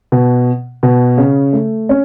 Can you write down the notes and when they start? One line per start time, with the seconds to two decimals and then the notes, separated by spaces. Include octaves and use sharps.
0.12 B2
0.83 B2
1.18 C#3
1.53 A3
1.89 C#4